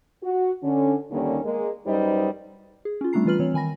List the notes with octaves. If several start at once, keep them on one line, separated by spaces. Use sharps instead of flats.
F#4
D3 C#4
D#2 D3 D#3 G3 A#3 C#4
G#3 A#3
F#2 G3 D#4 B4 C5 D#5
G#4
C#4 F4
G3 A3 C4 D4 A#5 C7
E3 G3 F4 B4 F6 F#7
E3 C4 C#5
D#3 G#5 B5 A#6